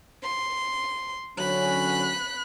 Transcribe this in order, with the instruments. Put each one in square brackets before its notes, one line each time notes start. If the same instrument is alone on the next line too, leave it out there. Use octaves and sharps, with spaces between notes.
[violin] C6
[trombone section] D3 F#3 C#4 [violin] B5 F#6